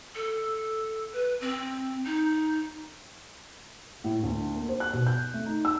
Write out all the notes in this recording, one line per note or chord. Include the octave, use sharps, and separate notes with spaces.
A4
B4
C4
D#4
A2
D2
A#3
C5
F#6
B2
G6
A3
D#4
E6